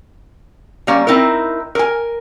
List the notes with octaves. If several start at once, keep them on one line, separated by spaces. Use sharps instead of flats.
G3 A#3 C#4
C4 D#4 E4 A#4
A#4 G#5